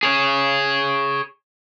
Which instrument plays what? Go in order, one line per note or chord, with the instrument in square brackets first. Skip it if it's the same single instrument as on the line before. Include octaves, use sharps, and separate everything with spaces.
[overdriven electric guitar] G#4 C#5